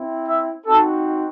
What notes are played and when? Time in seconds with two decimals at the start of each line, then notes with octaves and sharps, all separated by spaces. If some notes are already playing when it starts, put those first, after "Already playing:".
Already playing: C4 E4
0.28 E5
0.66 C4 D#4 F#4 A4